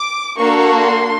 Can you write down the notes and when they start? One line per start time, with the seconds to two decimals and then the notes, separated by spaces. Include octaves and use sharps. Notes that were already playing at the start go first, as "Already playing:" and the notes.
Already playing: D6
0.37 A#3 D4 F#4 A4 C#6
0.83 C6